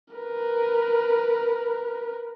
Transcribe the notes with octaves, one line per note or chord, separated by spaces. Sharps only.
A#4 B4